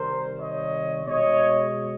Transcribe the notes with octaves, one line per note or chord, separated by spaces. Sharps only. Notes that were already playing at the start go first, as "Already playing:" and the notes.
Already playing: C3 D#3 G3 A#4 C5
C#5 D#5
B2 G#3 C#5 D#5